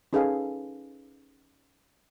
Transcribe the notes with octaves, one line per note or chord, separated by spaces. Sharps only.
C#4 D#4 G#4 A4 B4 F5